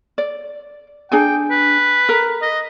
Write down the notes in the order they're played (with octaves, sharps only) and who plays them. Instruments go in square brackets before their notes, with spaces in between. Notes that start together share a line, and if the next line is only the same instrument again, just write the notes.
[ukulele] D5
[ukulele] D4 G#4 G#5 [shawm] G5
[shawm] B4
[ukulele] A#4
[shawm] D#5